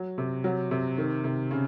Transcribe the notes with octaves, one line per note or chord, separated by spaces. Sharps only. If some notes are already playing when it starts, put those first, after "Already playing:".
Already playing: F#3
C3
F#3
C3
D#3
C3
C#3